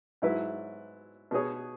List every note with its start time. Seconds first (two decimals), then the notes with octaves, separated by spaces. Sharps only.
0.22 G#2 F#3 E4 B4
1.31 B2 B3 G#4 C#5